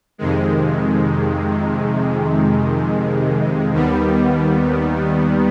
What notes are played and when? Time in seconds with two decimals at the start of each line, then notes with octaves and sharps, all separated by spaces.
0.18 F2 C3 D#3 G#3
3.72 D#2 D#3 G3 B3